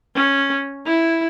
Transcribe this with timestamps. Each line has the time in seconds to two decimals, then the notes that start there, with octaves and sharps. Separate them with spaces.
0.16 C#4
0.87 E4